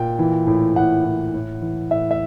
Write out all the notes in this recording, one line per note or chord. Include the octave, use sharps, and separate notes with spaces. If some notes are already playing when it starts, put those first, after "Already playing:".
Already playing: A#2 G5
E3
A2
A2 F#5
A2
A2
E3
A2 E5
E5